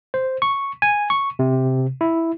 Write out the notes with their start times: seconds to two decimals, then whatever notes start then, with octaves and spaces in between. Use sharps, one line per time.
0.14 C5
0.42 C#6
0.82 G#5
1.10 C#6
1.39 C3
2.01 E4